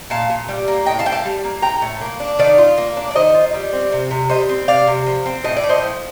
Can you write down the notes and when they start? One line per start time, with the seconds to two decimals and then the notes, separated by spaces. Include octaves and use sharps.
0.10 A#2 F5 A5
0.30 A#2
0.48 G3
0.68 A#3
0.86 A2 D#5 G5
0.99 F5 A5
1.06 A2 G5
1.12 F5 A5
1.25 G3
1.44 A#3
1.62 A2 G5 A#5
1.82 A2
2.01 A#3
2.20 D4
2.39 D#3 D5 F5
2.58 F4
2.78 A#3
2.97 D4
3.11 D5
3.15 D#3 C5 D#5
3.34 F4
3.54 G3
3.73 C4
3.92 C3
4.11 C3
4.29 G3 C5 D#5
4.49 C4
4.68 C3 D5 F5
4.87 C3
5.07 F3
5.26 C4
5.44 A2 D#5
5.56 D5
5.63 A2
5.69 C5 D#5
5.82 F3